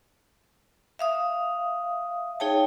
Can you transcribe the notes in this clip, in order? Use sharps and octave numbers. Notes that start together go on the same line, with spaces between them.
E5 F5 D#6
D#4 G#4 C#5 G5 A5